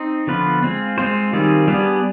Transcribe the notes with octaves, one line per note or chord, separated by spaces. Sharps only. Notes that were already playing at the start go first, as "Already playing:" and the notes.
Already playing: C4 D#4
D3 F3 B3 F4 B4
G#3 C4 F4
G#3 C4 F4 C5
D#3 G3 C4 F4 G#4
G3 B3 D4 G#4